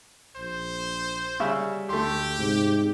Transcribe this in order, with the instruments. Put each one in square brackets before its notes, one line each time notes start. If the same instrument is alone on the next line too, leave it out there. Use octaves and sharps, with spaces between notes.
[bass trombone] A#1 [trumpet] C5
[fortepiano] C#3 E5 [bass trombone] G3
[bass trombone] D2 [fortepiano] A3 C6 [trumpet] G4
[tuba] G#2 [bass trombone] C3